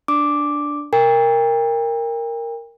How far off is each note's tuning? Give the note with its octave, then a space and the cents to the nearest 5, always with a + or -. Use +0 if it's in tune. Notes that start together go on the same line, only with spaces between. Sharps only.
D4 +0 D6 +0
A#4 -5 G5 +35